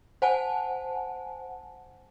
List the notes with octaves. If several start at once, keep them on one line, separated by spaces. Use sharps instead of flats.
C5 F#5 G#5 A5